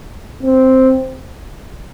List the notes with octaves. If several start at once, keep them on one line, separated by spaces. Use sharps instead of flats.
C4